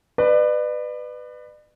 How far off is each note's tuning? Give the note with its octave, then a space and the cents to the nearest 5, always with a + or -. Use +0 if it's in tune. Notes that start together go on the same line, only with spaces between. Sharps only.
B4 +10 D5 +40